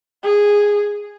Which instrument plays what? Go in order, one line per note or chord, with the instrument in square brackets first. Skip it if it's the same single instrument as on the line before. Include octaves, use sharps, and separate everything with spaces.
[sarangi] G#4